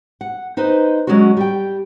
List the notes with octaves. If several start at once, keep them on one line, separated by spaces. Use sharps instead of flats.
F#5
D#4 B4 C5 D#5
F#3 G#3 C#4 D4 F#4
G3 G5